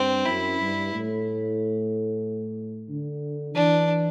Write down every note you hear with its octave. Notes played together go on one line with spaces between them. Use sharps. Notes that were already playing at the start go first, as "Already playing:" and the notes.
Already playing: G2 C4
F#2 E4
G2
A2
D3
E3 D4